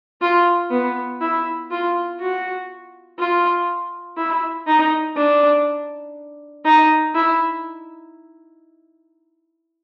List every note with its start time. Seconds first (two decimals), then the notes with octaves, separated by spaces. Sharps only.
0.21 F4
0.71 B3
1.21 E4
1.71 F4
2.20 F#4
3.18 F4
4.17 E4
4.66 D#4
5.16 D4
6.65 D#4
7.15 E4